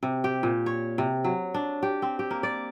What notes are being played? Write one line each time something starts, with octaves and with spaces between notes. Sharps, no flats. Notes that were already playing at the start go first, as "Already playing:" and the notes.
C3
G4
A#2
C#5
C3
F#3
D4
G4
C4
G4
A#3
D5